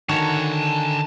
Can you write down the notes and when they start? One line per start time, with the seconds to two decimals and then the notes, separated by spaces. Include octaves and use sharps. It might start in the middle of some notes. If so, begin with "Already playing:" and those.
0.09 D3 D#3 F#4 A4 C#5 A5 A#5